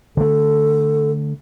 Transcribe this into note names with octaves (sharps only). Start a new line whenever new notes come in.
D3 A3 A4